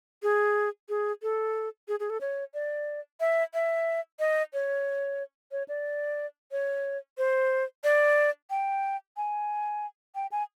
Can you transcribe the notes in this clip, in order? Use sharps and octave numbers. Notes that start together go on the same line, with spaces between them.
G#4
G#4
A4
G#4
G#4
A4
C#5
D5
E5
E5
D#5
C#5
C#5
D5
C#5
C5
D5
G5
G#5
G5
G#5